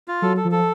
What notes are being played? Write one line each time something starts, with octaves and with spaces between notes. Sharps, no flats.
F4
F#3 A4
A4
F3
A4